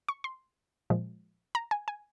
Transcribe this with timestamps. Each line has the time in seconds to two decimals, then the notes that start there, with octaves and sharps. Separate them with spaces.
0.09 C#6
0.24 C6
0.90 A#2 F3 G#3
1.55 A#5
1.71 G#5
1.88 G#5